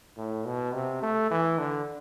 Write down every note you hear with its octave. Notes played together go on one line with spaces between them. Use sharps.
A2
B2
C3
A3
E3
D3